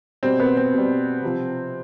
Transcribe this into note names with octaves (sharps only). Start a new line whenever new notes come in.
B2 G3 C4
B3
C4
B2 G3
C3 F3